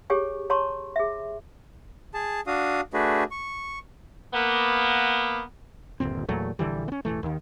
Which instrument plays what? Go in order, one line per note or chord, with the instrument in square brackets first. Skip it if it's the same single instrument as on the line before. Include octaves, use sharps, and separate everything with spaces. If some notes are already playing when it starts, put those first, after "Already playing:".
[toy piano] G4 G#4 C#5 G#5 C#6
C#5 A5 A#5 C6 C#6
G#4 E5
[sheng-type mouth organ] G#4 A5
D4 F#4 F5 D#6
A3 D4 F#4 G#4 B4
C#6
[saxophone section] A#3 B3
[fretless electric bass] G1 D#2 A#2 C4
E2 A#2 F#3 A3
A#1 D3 E3 G3
B3 C#4
E1 A1 E3 A3
D#2 D#3